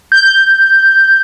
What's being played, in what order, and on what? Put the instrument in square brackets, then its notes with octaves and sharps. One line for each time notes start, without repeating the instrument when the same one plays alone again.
[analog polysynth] G6